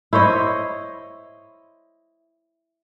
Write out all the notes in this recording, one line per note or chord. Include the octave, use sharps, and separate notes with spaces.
E4 C5 C#5 D#5